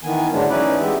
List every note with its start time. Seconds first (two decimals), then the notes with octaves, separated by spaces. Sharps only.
0.04 D#3 E3 B3 G#5
0.32 G#2 D3 F#3 G#3 A3 D4
0.49 C#4 D#4 E4 B4 D5
0.80 E3 G#3 B3 G4 E5